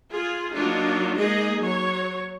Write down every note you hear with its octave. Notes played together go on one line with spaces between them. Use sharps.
F4 G#4
F#3 A#3 D4 D#4 F4
G#3 A#3 D#4 G#4 D#5
F#3 C#5